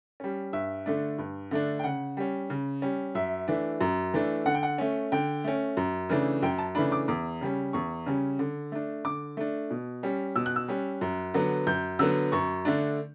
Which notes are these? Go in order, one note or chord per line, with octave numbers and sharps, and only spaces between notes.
G3 C#4
G2 E5
D3 A3 D4
G2
D3 A3 D4
G5
C#3 F#5
G3 C#4
C#3
G3 C#4
F#2 E5
E3 A3 D4
F#2
E3 A3 D4
D3 F#5
G5
F#5
A3 C#4
D3 G5
A3 C#4
F#2
C#3 E3 A3 D4
F#2 G5
A5
C#3 E3 A3 D4 B5
D6
E2 D6
C#3 G3 C#4
E2 C#6
C#3 G3 C#4
D3
A3 D4
D3 D6
A3 D4
B2
G3 C#4
B2 E6
F#6
E6
G3 C#4
F#2
D3 F#3 B3
F#2 G6
D3 F#3 B3 E6
F#2 C#6
D3 A3 D4